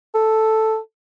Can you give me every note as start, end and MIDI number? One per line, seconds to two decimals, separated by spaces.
0.15 0.78 69